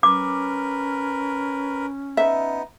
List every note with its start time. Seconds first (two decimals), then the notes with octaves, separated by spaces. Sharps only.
0.03 C#4 A#4 B4 D6
2.17 B3 D#4 E5